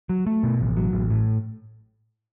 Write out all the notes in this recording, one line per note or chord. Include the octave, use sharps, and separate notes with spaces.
F#3
A3
B2
A1
F#3
A1
A2